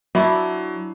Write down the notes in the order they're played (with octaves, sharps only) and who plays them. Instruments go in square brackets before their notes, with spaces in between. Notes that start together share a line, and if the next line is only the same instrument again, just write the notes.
[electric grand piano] F#3 [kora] D4 E4